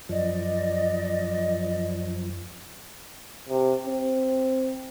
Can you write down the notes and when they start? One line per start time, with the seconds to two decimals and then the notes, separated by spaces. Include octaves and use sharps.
0.09 F#2 F3 D5 D#5
3.49 C3
3.87 C4